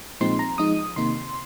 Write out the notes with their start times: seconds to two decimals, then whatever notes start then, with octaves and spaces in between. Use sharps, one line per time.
0.21 A#2 F3 G#3 C4 D#4 C6
0.39 A#5
0.58 F3 G#3 D#4 D#6
0.96 C3 D#3 A#3 D#4 C6